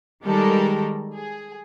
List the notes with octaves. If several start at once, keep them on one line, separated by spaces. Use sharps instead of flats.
D#3 G3 G#3 G4 A4 A#4
G#4